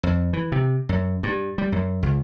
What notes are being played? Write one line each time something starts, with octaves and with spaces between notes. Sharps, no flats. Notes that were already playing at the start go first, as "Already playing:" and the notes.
F2
E3
C3
F#2
G2
G3
F#2
C#2